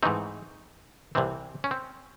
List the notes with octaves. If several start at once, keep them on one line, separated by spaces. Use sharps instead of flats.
G#2 E3 A3 C4 D#4
C2 C3 E3 C4
C#4
C4